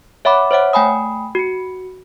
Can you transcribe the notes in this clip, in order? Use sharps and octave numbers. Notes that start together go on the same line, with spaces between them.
C#5 E5 F#5 B5 D6
C5 C#5 E5 F#5
A3 G5 G#5 B5 D#6
F#4 C#7